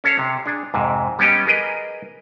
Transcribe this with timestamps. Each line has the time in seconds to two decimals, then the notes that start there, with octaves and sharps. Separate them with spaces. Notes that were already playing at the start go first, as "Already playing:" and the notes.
0.04 C#4 A4 C#5 F5
0.19 C3
0.46 D4 G#4
0.74 F2 G#2 C3
1.19 G3 B3 C#4 G4 D#5
1.47 G#4 A#4 B4 D#5